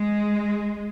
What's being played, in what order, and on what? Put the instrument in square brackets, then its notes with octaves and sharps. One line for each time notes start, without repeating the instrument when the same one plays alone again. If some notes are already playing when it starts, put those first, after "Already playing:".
Already playing: [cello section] G#3